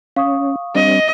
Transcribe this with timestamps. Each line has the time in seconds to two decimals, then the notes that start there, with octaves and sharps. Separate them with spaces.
0.16 C#4 F5 C#6 D#6
0.75 G3 C4 D4 D#5